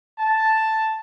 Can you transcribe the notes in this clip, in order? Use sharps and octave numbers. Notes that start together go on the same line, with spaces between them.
A5